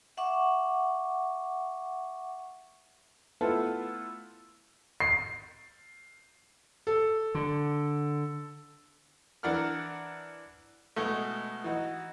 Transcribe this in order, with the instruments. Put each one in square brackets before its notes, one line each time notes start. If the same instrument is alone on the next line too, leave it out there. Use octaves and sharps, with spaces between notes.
[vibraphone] E5 F#5 C#6 D6
[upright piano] A3 B3 E4 F4 A4 B4
[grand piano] C7
[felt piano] A4
[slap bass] D3
[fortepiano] E3 D4 A#4 F#5 F6
B2 G#3 A3
E3 D#4 F#4